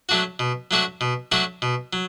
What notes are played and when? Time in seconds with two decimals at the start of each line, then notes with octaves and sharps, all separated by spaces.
0.09 F#3 A3 D4 F#4
0.39 B2
0.71 F#3 A3 D4 F#4
1.01 B2
1.32 F#3 A3 D4 F#4
1.62 B2
1.93 F#3